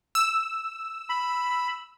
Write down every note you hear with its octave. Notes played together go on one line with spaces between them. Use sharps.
E6
B5